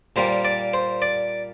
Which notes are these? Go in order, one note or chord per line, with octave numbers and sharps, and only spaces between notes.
A#2 G3 A#3 C5
D5
C5
D5